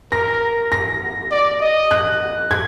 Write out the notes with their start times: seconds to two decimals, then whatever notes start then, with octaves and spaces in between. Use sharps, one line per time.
0.12 A#4 A#6
0.72 A#6
1.31 D5
1.61 D#5
1.91 F#6
2.51 G#6